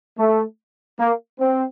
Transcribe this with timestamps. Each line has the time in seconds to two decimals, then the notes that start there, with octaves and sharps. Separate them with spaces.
0.19 A3
0.99 A#3
1.40 C4